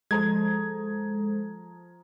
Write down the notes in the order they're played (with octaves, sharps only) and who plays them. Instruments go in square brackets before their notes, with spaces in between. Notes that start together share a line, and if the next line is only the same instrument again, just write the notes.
[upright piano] F3 A#5 D#6 [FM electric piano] G#3 A4 C5 [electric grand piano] G#6